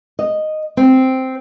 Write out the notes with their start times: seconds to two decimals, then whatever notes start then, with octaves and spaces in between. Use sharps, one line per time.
0.19 D#5
0.77 C4